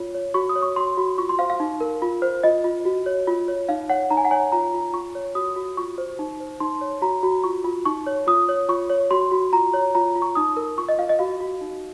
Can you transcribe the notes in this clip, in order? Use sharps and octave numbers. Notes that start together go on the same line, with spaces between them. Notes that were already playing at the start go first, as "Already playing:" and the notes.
Already playing: F4 C#5
C#5
F#4 C#6
D#6
C#5
C#6
F#4 C6
F#4
F4 C#6
C6
C5 F5
F5
D#4
A#4
F4
C5
F4 D#5
F4
F#4
C#5
F4
C#5
D#4 F5
C#5 F#5
D#4 A#5
G#5
F#5
C#5 G#5
F4 A#5
F4
F4 C#6
C#5
F#4 D#6
F#4
F4 C#6
C5
D#4
C5
D#4 C6
C#5
F#4 A#5
F#4
F4 C#6
F4
D#4 C#6
C#5
F4 D#6
C#5
F4 C#6
C#5
F#4 C6
F#4
F4 A#5
C#5
F4 A#5
F4
C#6
D#4 D#6
A#4
F4 C#6
D#5
F4 F5
D#5
F#4 F5
F#4
D#4